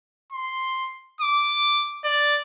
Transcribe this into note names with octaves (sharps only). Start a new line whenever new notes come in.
C6
D6
D5